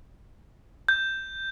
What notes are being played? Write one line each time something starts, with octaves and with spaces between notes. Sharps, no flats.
G6